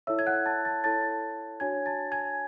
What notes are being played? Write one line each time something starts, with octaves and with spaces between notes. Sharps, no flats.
E4 A4 C#5 E5 E6
G#6
F#5 F#6
A5 A6
A5 A6
E4 A4 C#5 A5 A6
D4 F#4 C#5 G#5 G#6
A5 A6
G#5 G#6